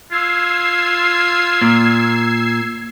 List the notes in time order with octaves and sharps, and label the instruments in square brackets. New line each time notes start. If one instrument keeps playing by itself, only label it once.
[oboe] F4 [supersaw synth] E6 G#6 C7
[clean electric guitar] A#2